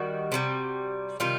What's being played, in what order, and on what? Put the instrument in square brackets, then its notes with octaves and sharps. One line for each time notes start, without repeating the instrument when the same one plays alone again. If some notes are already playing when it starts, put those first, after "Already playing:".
Already playing: [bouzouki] D#3 G3 F#4
C3 D#3 G3
C3 D#3 G3 F4